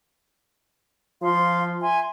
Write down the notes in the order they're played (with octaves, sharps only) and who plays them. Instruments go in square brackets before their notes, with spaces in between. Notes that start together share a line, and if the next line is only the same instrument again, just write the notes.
[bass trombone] F3 [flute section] F5 C6
[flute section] E5 G#5 C6